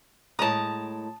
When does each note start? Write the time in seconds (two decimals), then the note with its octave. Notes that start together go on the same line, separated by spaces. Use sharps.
0.39 A2 G#3 A5 A#5 D#6